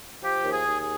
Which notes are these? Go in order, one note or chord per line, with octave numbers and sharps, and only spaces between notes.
F3 G4
D#2
G#4
D#2
G#4